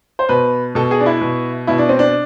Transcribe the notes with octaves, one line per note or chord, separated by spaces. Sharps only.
C5
B2 B4
B2 A4
G#4
D4
E4
B2
B2 E4
D4
C4
D4